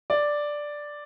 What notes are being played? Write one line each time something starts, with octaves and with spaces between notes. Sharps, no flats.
D5